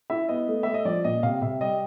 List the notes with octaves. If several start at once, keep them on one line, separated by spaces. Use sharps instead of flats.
E4 E5
B3 D#5
A3
A3 E5
D#5
F3 D5
A#2 D#5
C3 F5
C3 E5
G3 D#5